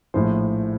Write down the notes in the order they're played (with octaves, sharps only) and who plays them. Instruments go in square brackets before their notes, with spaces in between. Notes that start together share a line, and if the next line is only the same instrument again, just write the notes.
[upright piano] A#1 A2 F3 C5